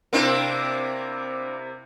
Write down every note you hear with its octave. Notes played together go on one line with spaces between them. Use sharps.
C3 A#3 C4 D4 E4 A#4